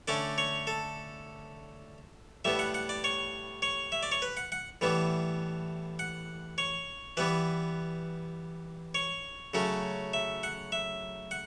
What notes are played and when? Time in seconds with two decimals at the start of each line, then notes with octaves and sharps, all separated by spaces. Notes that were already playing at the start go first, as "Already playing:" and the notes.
0.08 D3 A3 C#4 D5
0.38 C#5
0.67 A4
2.45 A2 G3 B3 E5
2.59 F#5
2.74 F#5
2.89 D5
3.04 C#5
3.62 C#5
3.92 E5
4.03 D5
4.12 C#5
4.22 B4
4.37 F#5
4.52 F#5
4.81 A2 E3 G3 B3
5.99 F#5
6.58 C#5
7.17 E3 G3 B3 B4
8.95 C#5
9.54 C#3 F#3 A3 C#4
10.13 E5
10.43 F#5
10.72 E5
11.31 F#5